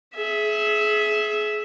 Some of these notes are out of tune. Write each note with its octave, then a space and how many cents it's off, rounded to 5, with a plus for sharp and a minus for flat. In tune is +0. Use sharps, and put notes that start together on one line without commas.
G#4 +30 E5 +0